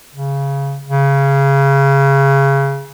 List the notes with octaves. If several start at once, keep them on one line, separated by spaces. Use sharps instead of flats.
C#3
C#3